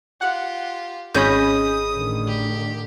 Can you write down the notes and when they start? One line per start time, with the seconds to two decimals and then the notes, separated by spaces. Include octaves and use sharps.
0.21 F4 G4 F#5
1.15 G#1 C#4 G#4 D#5 B5 D#6 G6
1.90 A2 D3 D#3
2.27 G4